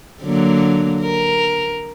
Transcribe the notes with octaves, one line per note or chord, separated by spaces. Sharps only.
D3 F#3 A#3
A#4